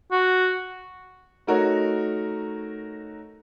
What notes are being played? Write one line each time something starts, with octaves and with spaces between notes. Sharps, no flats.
F#4
A3 D#4 F#4 A#4 C#5